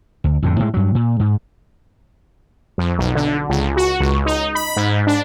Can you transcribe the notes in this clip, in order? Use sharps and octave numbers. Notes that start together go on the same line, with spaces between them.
D2
F2 A2 D3
A2 G3 G#3
G2 F#3
A#2
G#2
F2
B1
D3
C#2
F#4
C#2
D#4
B5
G#2
D4